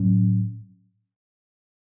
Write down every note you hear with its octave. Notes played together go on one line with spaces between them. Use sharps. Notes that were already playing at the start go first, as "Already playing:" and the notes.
Already playing: A2 F#3 C#4